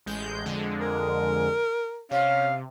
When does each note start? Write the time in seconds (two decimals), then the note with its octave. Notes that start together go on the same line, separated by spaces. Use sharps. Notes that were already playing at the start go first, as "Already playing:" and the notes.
0.06 A1 G#3 G6
0.46 F2 D3 G#3
0.81 A#4
2.11 C3 C#4 F5